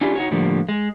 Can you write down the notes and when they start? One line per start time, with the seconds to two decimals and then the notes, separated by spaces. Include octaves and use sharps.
0.01 C#4 D4 E4 F4 G4 G#4
0.15 D#4 F#4 C#5
0.31 A2 D3 F3 G3 A#3
0.69 G#3